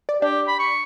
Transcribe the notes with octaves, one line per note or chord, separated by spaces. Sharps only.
D5
D4 G4
B5
C#6